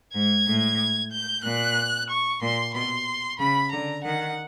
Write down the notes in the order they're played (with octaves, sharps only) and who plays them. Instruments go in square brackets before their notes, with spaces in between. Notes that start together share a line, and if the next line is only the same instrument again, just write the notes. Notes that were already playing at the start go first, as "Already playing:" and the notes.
[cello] G#2 [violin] G#6
[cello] A2
[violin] G6
[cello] A#2 [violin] F#6
[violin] C#6
[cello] A#2 [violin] C6
[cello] B2 [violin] C6
[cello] C#3 [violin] B5
[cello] D3 [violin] A#5
[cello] D#3 [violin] F#5